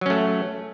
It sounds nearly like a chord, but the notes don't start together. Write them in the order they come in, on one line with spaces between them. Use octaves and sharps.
F#3 C#4 A3